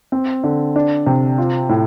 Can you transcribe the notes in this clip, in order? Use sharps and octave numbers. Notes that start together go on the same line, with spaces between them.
C4
D3
D4
C3
F4
A2